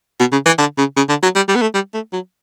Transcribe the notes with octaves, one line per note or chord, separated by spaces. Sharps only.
B2
C#3
E3
D3
C#3
C#3
D3
F#3
G3
G3
B3
A3
G3
A3
F#3